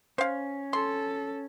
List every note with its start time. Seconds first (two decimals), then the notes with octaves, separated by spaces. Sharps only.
0.18 C#4 C5 F5
0.73 A4 C6